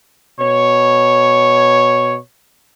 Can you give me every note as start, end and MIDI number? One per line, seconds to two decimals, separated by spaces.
0.40 2.19 47
0.40 2.19 73